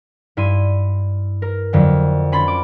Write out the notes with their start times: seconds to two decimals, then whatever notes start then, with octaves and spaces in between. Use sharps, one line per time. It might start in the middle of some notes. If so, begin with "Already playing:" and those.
0.37 G2 E4 C6 D#7
1.42 A#4
1.73 F2 D3 F#3
2.32 C#4 B5 C6 A6
2.48 D6